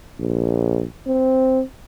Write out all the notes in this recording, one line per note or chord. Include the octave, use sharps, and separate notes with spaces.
A#1
C4